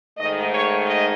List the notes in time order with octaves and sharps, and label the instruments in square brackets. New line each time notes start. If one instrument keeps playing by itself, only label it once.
[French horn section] G#2 D#3 A3 D#5
C#5
D#5